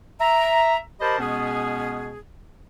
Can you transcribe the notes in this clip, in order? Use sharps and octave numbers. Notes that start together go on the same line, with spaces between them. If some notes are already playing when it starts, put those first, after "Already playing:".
E5 A#5
G4 A#4 C5 D#5 A5 B5
B2 G#3 B3 C#4 G#4